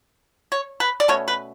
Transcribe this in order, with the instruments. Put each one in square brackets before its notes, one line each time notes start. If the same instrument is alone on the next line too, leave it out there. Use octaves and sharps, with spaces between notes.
[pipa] C#5
B4
D5
B2 A3 C#4 C#5
B4